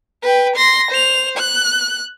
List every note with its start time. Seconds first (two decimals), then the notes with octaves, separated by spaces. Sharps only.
0.23 B4 G5
0.56 C6 A#6
0.91 C5 F7
1.38 F#6